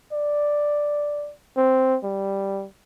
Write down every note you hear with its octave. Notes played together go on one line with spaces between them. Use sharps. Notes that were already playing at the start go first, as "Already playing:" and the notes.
D5
C4
G3